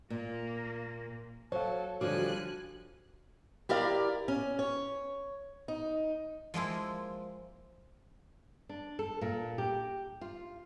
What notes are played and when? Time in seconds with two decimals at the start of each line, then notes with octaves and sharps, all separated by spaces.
0.10 A#2 A#3
1.52 F#3 A4 C5 C#5 F5
2.01 D3 F3 G3 F#4 G#5 F#6
3.69 E4 G4 A#4 D5 F5
4.28 C#4
4.59 C#5
5.68 D#4
6.54 F3 G#3 A#3 E4
8.69 D4
8.99 A4
9.21 A#2
9.58 G4
10.21 F4